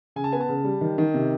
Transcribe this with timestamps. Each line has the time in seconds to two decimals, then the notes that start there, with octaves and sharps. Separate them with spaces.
0.16 C#3 G#5
0.24 A5
0.32 B3 G#5
0.40 A5
0.48 C#3
0.64 G3
0.81 D#3
0.98 D#3
1.14 C3